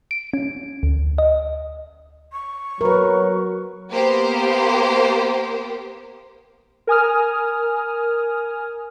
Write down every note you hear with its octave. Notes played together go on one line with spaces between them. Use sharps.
D7
C#4
D2
D#5
C#6
F#3 A#4 B4
A#3 B3 G4 C5
A#4 G#5 D#6 F6